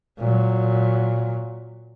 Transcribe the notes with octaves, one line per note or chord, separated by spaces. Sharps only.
A#2 F#3